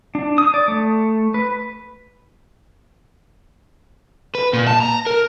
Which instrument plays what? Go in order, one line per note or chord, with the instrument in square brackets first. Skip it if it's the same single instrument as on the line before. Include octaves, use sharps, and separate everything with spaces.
[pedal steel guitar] D4
D#6
D5
A3
B4
[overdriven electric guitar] B4
A#2
A5
A#5
A#4